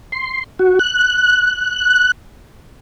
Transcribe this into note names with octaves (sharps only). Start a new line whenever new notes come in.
C6
F#4
F#6